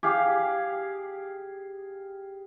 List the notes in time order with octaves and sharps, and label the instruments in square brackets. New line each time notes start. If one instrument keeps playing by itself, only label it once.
[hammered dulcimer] G4 G#4 F5